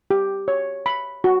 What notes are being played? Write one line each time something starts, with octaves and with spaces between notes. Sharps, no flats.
G4
C#5
B5
F#4